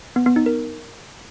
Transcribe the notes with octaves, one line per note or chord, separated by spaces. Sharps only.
B3
B3
D#4
A#4